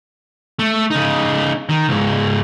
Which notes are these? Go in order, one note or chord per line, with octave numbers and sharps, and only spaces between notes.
A3
C#3 D#4
D#3
C#2 G#2